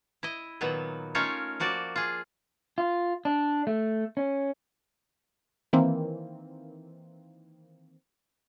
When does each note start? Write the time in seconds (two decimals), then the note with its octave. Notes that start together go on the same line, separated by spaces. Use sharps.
0.23 E4 D#5
0.61 A#2 D#3 F#3 B3
1.15 A3 C#4 D#4 F4 A#4 C#5
1.60 F3 A#3 F#4 D5
1.96 F4 G#4
2.78 F4
3.25 D4
3.67 A3
4.17 C#4
5.73 D#3 E3 A#3 C4